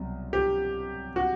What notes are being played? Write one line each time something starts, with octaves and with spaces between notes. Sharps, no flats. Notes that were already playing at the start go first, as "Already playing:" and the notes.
Already playing: C2 B2 F#3
G4
F#4